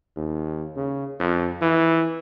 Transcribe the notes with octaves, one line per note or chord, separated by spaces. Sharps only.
D#2
C#3
F2
E3